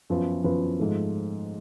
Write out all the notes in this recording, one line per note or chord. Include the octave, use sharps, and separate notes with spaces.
F#2 F3 B3 F4 B4
F#2 F3 B3 F4 B4
G#2 F3 A3